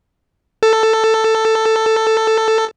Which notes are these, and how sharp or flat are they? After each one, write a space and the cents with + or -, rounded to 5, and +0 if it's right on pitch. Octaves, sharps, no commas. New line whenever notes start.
A4 +10